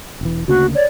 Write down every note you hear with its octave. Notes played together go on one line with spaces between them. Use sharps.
E1 E3
D2 C#3 A#3 F#4
C#5 D5